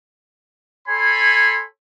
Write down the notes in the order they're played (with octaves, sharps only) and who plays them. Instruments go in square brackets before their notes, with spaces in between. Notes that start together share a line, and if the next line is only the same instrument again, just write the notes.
[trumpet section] A4 C#5 G#5 B5 C6